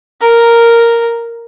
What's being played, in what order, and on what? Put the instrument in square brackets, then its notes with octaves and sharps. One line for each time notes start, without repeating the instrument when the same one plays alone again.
[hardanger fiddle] A#4